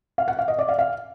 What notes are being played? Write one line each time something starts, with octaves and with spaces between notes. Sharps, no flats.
F5
F#5
F5
D#5
D5
F5
F5